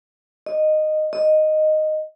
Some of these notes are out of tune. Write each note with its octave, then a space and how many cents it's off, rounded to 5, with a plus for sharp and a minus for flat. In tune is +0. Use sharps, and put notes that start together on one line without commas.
D#5 -10
D#5 -5